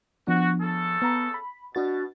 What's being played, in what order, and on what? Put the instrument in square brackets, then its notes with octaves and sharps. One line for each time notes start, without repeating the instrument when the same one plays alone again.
[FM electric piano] F3 B3 D4 [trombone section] F#4
[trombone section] C#3 A4
[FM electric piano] B3 A#5 B5
B5
[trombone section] B2 [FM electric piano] D4 F#4 A6